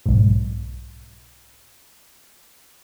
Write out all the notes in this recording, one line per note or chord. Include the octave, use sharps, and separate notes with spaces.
B1 G#2